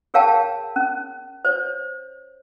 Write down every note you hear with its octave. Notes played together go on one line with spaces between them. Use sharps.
G#4 A#4 C#5 F5 G5 A5
C#4
C5 C#5